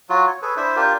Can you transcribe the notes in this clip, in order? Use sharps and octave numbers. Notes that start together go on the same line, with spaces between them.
F#3 F4 F#4
C#5
G#4 A4 B4 C#5
D4 E4 C5 E5
D4 F4 G4 A#4